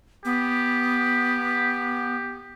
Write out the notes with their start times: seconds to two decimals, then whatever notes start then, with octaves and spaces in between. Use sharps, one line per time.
0.25 B3 G4